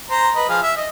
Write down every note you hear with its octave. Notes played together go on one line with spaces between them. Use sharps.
C5 A#5
B4 D#5
F3 G#4 F5
E5
D#5